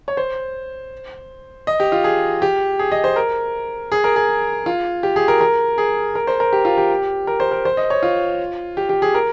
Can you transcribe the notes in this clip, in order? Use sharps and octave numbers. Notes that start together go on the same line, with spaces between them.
C#5
C5
D#5
G4
F4
G#4
G4
G#4
D#5
C5
A#4
G#4
A#4
G#4
F4
G4
G#4
A#4
A#4
G#4
A#4
C5
A#4
G4
F4
G4
A#4
C5
A#4
C5
D#5
C#5
F4
G4
G4
G#4
A#4